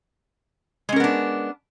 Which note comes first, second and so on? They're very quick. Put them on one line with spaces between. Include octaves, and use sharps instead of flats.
G#3 C#4 A#4 B3 D4